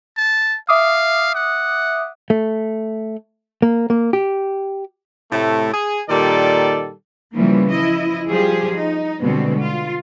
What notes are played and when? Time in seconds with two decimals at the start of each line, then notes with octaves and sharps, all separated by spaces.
0.17 A5
0.69 E5 F5 D6 D#6
1.35 F#5
2.30 A3
3.62 A#3
3.90 A#3
4.13 G4
5.31 A2 C3 A3
5.72 G#4
6.09 A#2 D#3 G3 A4 D5
7.34 C#3 E3 F3 G3 A#3
7.72 F3 E4 D#5
8.29 F3 G3 G4 G#4
8.74 D#4
9.22 B2 D3 G3 G#3 B3 C4
9.60 F4